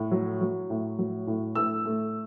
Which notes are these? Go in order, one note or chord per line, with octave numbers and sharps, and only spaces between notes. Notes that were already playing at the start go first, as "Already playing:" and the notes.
Already playing: A2
F#3
F#3
A2
F#3
A2
A2 E6
A3